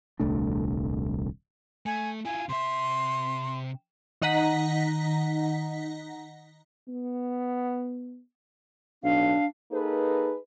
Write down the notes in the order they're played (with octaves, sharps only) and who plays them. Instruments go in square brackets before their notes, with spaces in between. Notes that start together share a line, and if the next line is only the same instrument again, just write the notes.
[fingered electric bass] D#1 C2 A3 D4
[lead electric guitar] A3 [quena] G#5
[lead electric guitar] E4 F4 [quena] G#5
[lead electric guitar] C3 E5 [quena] C6
[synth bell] D#3 D#4 D#5 F#5 A#5 B6
[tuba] B3
[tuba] B1 [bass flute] D4 [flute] F5
[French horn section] A#3 D#4 G#4 A4 B4